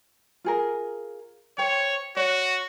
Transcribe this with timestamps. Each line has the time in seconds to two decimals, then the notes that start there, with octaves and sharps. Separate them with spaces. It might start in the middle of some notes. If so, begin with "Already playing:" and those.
0.44 F4 G#4 A#4
1.58 C5 C#5 G5
2.17 F#4 C#5